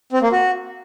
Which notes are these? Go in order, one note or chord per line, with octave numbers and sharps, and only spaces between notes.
C4
A#3
F#4